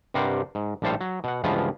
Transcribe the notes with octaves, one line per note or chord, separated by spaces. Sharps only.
G2 C3 G3 A#4 C5 F#5
G#2
A#1 A2 G3 A4 C5 F5
F#3
B2 F#5
C#2 G2 E3 F3 B3 F4